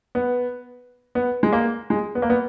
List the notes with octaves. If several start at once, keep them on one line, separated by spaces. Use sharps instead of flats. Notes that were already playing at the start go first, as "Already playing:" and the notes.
B3
B3
G#3
A#3
G#3
B3
A#3
B3